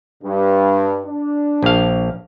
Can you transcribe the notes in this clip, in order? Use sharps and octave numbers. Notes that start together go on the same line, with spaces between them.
G2
D4
A#1 F5